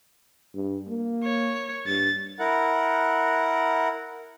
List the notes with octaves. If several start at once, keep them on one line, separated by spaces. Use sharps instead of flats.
G2
A#3
C#5
G2 A6
E4 A#4 F#5